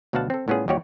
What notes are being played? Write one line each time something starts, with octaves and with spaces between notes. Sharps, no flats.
D2 B2 F#3 F5 F#5 A5
C4 A4
A2 G3 B3 C#4 F4 G#4
D#2 G3 F#4 G4 C#5 D5